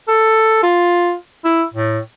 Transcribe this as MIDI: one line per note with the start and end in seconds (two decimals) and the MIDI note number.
0.08 0.62 69
0.63 1.14 65
1.45 1.63 64
1.74 1.99 45